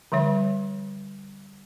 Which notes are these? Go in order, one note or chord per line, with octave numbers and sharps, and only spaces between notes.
D3 F3 G3 C#5